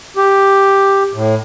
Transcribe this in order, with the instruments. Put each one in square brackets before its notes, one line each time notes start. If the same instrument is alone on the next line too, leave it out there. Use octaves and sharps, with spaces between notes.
[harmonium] G4
A2